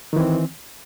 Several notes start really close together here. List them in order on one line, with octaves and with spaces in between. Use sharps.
D#3 E3 C4